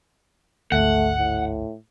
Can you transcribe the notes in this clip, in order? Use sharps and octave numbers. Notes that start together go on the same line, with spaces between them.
G#1 D2 A3 F#5
A2